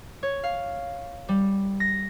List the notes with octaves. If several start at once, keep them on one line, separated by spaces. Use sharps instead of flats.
C#5
F5
G3
A#6